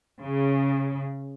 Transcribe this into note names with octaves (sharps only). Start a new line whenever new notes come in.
C#3